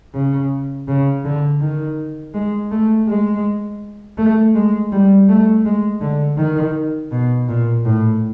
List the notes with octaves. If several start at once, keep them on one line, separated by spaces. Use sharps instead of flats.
C#3
C#3
D3
D#3
G#3
A3
G#3
A3
G#3
G3
A3
G#3
D3
D#3
B2
A#2
A2